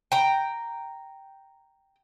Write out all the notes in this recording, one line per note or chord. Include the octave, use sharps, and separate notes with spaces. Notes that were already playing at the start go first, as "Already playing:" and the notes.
G5 A#5